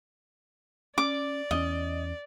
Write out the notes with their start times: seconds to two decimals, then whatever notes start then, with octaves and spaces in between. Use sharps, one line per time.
0.98 C#4 D5 D6
1.51 E2 C4 C#4 D#5